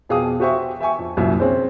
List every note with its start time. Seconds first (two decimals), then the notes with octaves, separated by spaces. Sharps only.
0.09 F2 B2 G#4 F5 G5 D#6
0.40 F#4 G4 C5 E5 G#5 C#6
0.80 E5 G5 G#5 C#6
0.99 F2
1.17 C2 F#2 A#2 E5
1.40 C4 C#4 G#4 C5